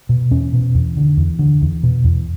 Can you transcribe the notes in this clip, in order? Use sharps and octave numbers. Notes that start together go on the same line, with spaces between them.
B2
E2 C#4
B2
E2
D3
E2
D3
E2
B2
E2